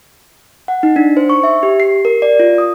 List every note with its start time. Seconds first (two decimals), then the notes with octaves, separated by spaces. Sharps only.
0.68 F#5
0.83 D#4
0.96 D4
1.17 C5
1.30 C#6
1.44 E5
1.63 G4
1.80 C7
2.05 A#4
2.22 D5
2.40 F4
2.58 D#6